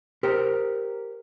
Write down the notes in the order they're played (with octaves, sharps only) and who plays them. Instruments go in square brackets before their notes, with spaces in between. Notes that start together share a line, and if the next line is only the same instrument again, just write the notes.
[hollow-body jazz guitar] G4 A#4 C5